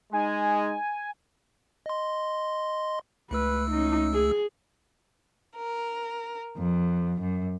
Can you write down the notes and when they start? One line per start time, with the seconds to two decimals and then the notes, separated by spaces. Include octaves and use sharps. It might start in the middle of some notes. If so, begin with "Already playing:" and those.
0.13 G#3 D#4 G#5
1.86 D#5 C6
3.31 C#2 A3 B4 E6
3.71 C#4 D#4
4.14 G#4
5.55 A#4
6.56 F2
7.21 F#2